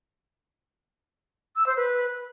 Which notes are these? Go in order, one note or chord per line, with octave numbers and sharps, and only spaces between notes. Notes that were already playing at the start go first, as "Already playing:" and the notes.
E6
C5
B4